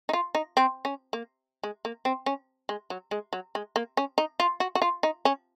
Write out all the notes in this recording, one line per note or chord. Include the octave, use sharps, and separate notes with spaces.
D#4
F4
D#4
C4
C#4
A#3
G#3
A#3
C4
C#4
G#3
F#3
G#3
F#3
G#3
A#3
C#4
D#4
F4
F#4
F#4
F4
D#4
C#4